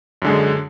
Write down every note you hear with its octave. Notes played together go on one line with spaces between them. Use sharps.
F#2 D3 G#3